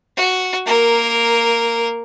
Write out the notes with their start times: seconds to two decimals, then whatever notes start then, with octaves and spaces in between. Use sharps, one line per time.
0.17 F#4
0.66 A#3 A#4